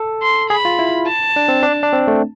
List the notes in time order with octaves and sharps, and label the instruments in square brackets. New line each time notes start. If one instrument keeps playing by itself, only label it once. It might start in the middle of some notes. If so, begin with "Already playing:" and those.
Already playing: [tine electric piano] A4
[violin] C6
[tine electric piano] G#4 [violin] B5
[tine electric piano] F4
E4
[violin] A5
[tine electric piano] D4
C4
D4
D4
C4
A3